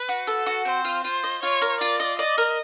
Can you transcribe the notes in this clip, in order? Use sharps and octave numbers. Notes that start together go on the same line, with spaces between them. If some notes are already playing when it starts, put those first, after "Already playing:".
Already playing: B4
F#4
A4
F#4
C4 C5
F4
F4 C5
D#5
F4 C#5
A#4
F4 D5
D#5
D5 D#5
A#4